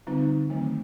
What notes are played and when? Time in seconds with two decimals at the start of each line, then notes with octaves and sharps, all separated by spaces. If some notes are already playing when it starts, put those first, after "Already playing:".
0.07 D3 G3 C4 D#4 F4
0.49 D#3 F#3 A3 C4